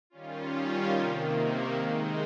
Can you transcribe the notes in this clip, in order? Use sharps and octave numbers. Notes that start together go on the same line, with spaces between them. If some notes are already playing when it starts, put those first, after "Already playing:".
D#3 G3 C#4 F4
C3 D#3 A#3
D#3 G#3 D#4